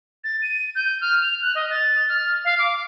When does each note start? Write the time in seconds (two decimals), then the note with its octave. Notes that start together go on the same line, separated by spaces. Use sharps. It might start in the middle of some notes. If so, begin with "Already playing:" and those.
0.24 A6
0.42 D#7
0.75 G6
1.01 F6
1.22 F7
1.42 F#6
1.55 D#5
1.71 A6
2.09 F6
2.45 F5
2.59 D6